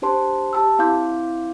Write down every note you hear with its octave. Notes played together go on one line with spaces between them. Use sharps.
D4 G4 C5 A5 C6
G4 A5 E6
C4 E4 F5 C6 D6 G6